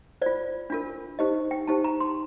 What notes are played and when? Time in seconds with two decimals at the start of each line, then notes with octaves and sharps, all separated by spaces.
0.22 F4 C5 D5
0.70 D4 F4 A#4
1.19 D#4 G4 C5 D#5
1.51 G5
1.68 D#4 G4 C5 A5
1.84 A#5
2.00 C6